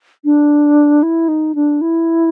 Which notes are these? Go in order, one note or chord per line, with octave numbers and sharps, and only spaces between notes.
D4
E4
D#4
D4
E4